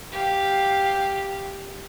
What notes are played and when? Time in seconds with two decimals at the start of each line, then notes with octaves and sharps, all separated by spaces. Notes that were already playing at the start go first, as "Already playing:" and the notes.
0.12 G4 F5